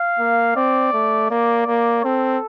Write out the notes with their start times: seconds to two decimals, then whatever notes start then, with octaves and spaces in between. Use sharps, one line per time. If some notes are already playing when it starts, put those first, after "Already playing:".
Already playing: F5
0.19 A#3
0.56 C4 D5
0.93 A3
1.30 A#3 D5
1.67 A#3
2.04 C4 A4